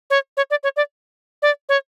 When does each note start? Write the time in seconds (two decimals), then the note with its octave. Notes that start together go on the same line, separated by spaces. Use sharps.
0.10 C#5
0.37 C#5
0.50 D5
0.63 C#5
0.76 D5
1.42 D5
1.69 C#5